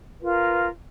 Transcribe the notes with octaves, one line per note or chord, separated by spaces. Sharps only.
F4 A#4 B4